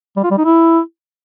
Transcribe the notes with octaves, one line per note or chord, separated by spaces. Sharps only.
G3
F4
G3
D#4
E4